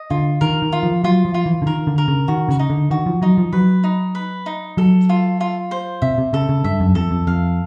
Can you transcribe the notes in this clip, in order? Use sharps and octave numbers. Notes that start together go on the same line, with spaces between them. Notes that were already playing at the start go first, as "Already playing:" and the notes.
Already playing: D#5
D3 F4
D#3 A#4
D#3
F4
F3
F#3 F4
F3
F4
E3
D3
D#3 A#4
D3
A#4
C#3
D#3 F#4
C#3
D#4
D3
D#3 F#4
F3
F#3 D#4
F3
F#3 B4
D#4
B4
D#4
F#3 A4
F4
F4
C5
C3 E5
C3
C#3 A4
C#3
G2 E5
F#2
F2 A4
F2
F2 F5